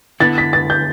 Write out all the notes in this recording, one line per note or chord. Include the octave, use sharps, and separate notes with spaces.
D3 B3 E4 A6
B6
A6
G6